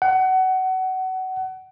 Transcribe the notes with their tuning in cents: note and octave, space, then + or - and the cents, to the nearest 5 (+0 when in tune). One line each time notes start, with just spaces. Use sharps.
F#5 +25